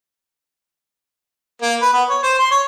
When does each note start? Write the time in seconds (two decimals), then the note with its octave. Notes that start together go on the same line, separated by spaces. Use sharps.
1.62 A#3
1.81 B4
1.93 B3
2.09 C#5
2.23 C5
2.39 C6
2.51 C#5